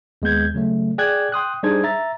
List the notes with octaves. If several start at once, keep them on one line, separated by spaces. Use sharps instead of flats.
D#2 G#3 B3 G6 G#6
C#3 F#3 A3
G#4 D5 G5 G#5 F#6 G#6
G5 C6 D#6 F#6
G3 D4 D#4 G#4 C5 G#6
E5 A#5 A6